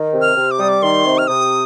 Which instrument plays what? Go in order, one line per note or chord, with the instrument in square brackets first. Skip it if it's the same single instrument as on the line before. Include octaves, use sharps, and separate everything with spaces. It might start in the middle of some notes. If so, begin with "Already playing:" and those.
Already playing: [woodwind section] D#3
C3
[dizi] F6
[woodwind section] C3
[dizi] D6
[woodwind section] G3 [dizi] D#6
[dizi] D6
[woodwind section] D#3 [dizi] C6
[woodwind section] C3
[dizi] F6
[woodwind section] C3 [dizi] D#6